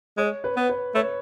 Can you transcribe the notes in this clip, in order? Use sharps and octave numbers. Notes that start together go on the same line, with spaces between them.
G#3 C#5
B4
B3
B4
A3 C#5